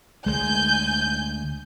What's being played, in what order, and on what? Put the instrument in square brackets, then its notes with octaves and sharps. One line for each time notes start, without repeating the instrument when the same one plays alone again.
[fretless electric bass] D2 G#3 [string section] G#5 G6